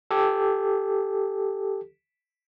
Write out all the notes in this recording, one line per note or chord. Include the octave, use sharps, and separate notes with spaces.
G4 A4